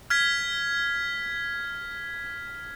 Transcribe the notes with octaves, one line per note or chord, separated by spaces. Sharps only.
F6 G#6 B6